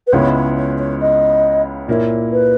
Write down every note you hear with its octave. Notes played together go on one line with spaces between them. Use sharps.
B4
C#2 C#3 G#3 B3 E4 C#5
C#5
C#5
C#5
D#5
A#2 A#3 E4 C#5
B4